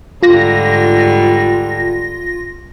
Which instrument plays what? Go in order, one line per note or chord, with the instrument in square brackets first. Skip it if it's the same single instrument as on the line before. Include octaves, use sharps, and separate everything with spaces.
[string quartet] G#2 D3 G3 [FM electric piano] F4 A#6